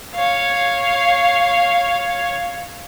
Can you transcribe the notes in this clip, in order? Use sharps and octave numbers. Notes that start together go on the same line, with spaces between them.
C#5 F5